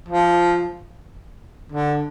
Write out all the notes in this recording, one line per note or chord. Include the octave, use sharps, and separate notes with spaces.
F3
D3